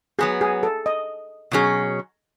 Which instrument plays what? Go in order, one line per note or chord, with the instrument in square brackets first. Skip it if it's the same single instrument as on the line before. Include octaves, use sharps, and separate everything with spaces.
[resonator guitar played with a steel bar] F#3 B3 F#4 [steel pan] G#4
[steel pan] G#4
A4
D#5
[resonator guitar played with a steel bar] B2 F#3 C#4 G#4